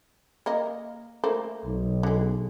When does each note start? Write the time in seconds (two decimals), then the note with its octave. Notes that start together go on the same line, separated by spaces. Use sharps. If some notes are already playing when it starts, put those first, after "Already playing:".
0.46 A#3 A#4 D#5
1.24 A3 A#3 C5
1.66 B1
2.03 D3 G#3